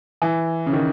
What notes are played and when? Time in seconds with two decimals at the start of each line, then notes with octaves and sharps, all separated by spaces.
0.22 E3
0.66 C#3
0.73 D#3